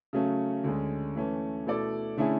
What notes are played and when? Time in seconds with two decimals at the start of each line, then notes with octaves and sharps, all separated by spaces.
0.13 C#3 F#3 A3 C#4
0.64 D2 D3 G#3 C#4
1.16 E3 A3 C#4
1.66 B2 A3 E4 A4 D5
2.17 D3 A3 C#4 E4 G#4